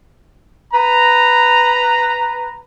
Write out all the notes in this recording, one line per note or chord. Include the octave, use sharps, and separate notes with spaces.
B4 A#5